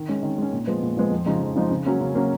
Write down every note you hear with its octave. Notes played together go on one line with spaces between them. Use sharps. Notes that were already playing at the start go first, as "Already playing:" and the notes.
Already playing: D#3
G#3 C#4
D#3
G#3 C#4
A#2
F3 G#3 B3
A#2
F3 G#3 B3
F2
C#3 F3 G#3 D#4
F2
C#3 F3 G#3 D#4
C#3
F#3 A#3 C#4
C#3
F#3 A#3 C#4